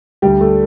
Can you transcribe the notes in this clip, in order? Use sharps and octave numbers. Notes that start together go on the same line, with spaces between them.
D2 G3 G4
A3 A4